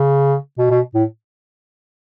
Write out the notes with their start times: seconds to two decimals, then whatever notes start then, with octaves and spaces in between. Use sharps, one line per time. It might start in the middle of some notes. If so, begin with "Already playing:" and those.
Already playing: C#3
0.58 B2
0.70 B2
0.94 A2